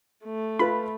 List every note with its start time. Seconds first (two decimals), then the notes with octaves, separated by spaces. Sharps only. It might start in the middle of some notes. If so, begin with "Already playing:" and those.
0.25 A3
0.59 F4 B4 B5